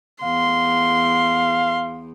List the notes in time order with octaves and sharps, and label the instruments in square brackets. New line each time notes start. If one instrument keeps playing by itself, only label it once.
[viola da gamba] E2 [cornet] F5 [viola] C6